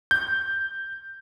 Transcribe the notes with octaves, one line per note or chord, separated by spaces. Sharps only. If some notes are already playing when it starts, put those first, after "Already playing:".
G6